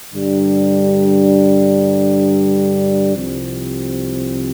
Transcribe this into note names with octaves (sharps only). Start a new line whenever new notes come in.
G2 D3 G3 D4
C2 C3 F3 C4